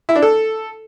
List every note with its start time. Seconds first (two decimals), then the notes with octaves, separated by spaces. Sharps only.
0.09 E4
0.16 D4
0.22 A4